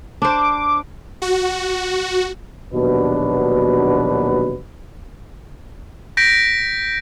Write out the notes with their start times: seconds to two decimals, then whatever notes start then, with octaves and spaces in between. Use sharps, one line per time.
0.22 D4 C5 D6
1.22 F#4
2.72 A#1 D#2 B2 F#3 D4 B4
6.17 G6 A#6 B6 D7